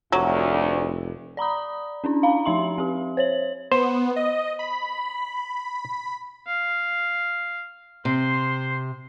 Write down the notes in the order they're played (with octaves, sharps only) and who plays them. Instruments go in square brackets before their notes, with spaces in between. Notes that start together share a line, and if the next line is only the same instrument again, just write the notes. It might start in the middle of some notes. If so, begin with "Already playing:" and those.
[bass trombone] F1 [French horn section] D2 [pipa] F#3
[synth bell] D5 A#5 B5 D#6
C#4 D4 E4
F5 A#5 B5
F3 D#4 E5 C6 F#7
C4 G4
C5 C#5 F#7
[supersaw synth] B3 [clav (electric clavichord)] C5
[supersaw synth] D#5
B5
[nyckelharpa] F5
[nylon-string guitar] C3 [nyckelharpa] C5 C6